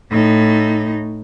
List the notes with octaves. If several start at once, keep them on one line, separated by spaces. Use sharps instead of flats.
A2 D#4